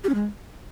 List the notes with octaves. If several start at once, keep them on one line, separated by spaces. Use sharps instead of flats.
G4
C#4
G#3